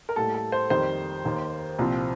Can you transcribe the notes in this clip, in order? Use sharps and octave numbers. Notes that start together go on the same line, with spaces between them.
A#4
A2 G3 A#3 A4
A4
C5
F2 D#3 G3 C5
D#2 D#3 A#3
C2 A#2 F3 C4